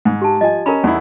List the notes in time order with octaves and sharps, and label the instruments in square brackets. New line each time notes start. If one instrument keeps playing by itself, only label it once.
[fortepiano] G#2
[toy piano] G4 A5
[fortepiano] F3 G#5 [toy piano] D#5
[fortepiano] C#4 [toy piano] A#4 A#5 B5
[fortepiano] E2 E4